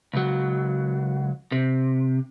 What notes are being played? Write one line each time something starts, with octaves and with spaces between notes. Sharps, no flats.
C#2 F#3
C3